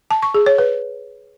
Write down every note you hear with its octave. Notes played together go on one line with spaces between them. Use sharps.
A5
C#6
G#4
C#5
B4